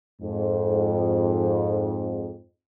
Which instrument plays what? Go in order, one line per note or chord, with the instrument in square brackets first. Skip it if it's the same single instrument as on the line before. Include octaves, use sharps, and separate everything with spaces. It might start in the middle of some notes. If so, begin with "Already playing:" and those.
[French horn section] F2 G#2